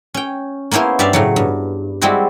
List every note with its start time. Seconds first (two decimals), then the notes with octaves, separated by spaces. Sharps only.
0.14 C#4 G5
0.71 A#3 B3 C#4 E4 C5
0.99 G2 G4 D5 E5 F5
1.13 A2 C#3 F#3
1.36 G2
2.01 G3 G#3 C4 E4 F#4